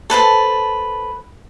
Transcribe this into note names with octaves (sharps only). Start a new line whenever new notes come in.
A4 B4 C5 A5